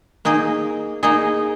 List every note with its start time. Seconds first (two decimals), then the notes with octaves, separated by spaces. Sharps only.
0.25 A#3 D#4 G#4 D#5
1.03 A#3 D#4 G#4 D#5